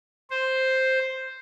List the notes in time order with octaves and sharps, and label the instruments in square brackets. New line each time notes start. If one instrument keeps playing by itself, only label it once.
[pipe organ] C5